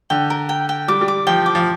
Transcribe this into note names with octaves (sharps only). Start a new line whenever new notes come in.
D3 G5
A#4
G5
G5
G3 D6
G3
D6
F3 G5
D6
F3